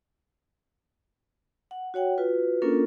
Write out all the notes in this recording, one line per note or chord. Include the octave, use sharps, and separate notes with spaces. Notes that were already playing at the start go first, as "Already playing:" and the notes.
F#5
F#4 C#5 F#5 G5
F4 F#4 B4
A#3 C#4 D4 F4 A4 A#4